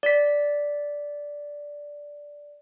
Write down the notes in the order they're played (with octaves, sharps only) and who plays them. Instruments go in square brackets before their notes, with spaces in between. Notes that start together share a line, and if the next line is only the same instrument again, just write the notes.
[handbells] D5 B6